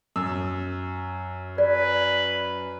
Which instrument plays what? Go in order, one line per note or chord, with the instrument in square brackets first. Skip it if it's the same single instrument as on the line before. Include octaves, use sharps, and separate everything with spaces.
[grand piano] F#2 E6
[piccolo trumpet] B4 [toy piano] D5